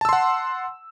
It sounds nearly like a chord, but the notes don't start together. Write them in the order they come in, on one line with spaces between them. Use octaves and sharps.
A5 E6 C6 F#5